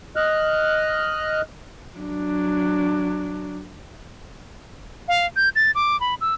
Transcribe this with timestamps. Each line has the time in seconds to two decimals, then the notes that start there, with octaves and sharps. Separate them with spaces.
0.16 D#5 F6 F#6
1.98 F#3 D4
5.08 F5
5.36 G6
5.56 A6
5.75 D6
6.00 B5
6.21 E6